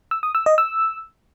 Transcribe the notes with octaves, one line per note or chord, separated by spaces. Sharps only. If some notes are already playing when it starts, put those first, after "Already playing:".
E6
D#6
E6
D#5
E6